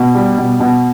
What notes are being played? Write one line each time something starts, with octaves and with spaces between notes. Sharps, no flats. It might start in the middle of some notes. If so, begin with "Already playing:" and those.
Already playing: B2
G3
B2
B2